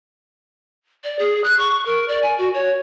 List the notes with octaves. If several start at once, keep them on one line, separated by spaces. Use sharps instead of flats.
D5
G#4
F#6
C#6
A#4
D5
G#5
F#4
C#5